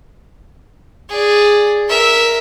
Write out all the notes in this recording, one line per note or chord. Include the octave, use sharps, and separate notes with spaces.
G#4 D5
A#4 E5